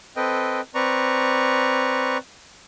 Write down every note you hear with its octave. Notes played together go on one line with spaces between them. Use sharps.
C4 A4 B4 D#5 G5
C4 B4 D5 A#5 C#6